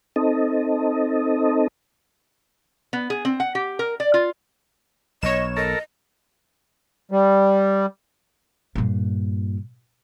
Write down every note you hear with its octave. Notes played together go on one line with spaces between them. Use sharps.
C4 D#4 A4 D#5
B3
G#4
C4
F#5
G4
A#4
D5
F4
B1 C#5 D#5 E7
A4 A#4 D#5
G3
G2 A#2